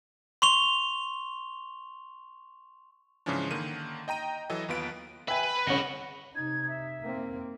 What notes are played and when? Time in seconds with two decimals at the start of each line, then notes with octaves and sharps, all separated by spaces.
0.42 C6 C#6 F7 G7
3.26 G#2 C#3 E3 F3 C#4 D4
3.51 D3 D#3 A#3 D#7
4.08 D#5 G5 A#5 D#7
4.50 E3 F#3 A4 D#5
4.68 D#2 B3 F4 B4 D7
5.28 B4 E5 G5 G#5
5.43 B5
5.67 C2 C#3 C#5 D#5 F#5
6.35 C3 D#4 G#6
6.67 E5
7.01 A#3 C4